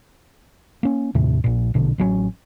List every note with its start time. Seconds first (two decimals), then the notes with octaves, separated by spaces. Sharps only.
0.83 A#3 C#4
1.15 D#2 A2 C3 D#3
1.44 A#1 A#2
1.74 A#1 B2 D3
1.98 A1 F#3 G3 C#4